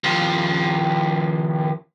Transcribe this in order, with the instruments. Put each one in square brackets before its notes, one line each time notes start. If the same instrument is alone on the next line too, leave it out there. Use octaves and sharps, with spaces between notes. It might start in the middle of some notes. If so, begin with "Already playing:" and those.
[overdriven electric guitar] D#2 F3